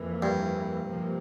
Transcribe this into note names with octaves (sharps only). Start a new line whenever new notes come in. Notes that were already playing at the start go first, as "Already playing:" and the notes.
Already playing: F2 E3 A#3
G2
C3 F3 A#3